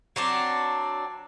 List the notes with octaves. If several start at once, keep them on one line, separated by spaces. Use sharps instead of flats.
F#3 C4 D4